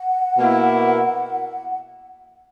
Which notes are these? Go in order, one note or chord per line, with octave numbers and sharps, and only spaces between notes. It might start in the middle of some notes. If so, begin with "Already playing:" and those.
Already playing: F#5
B2 A#3 E4